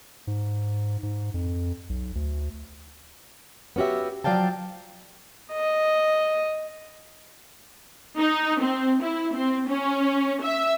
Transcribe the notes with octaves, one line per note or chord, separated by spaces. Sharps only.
G#2
G#2
F2
B1
D2
B3 C#4 F#4 G4 E5
F3 F#3 D5 F5 G5 A5
D#5
D#4
C4
E4
C4
C#4
E5